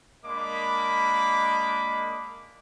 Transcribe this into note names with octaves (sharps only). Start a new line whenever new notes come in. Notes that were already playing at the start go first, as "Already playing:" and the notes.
G#3 A#3 D4 D#5 B5 D6